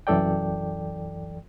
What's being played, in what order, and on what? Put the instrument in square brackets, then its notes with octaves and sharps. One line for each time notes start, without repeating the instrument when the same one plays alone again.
[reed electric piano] C2 F#2 E3 A4 D5 G5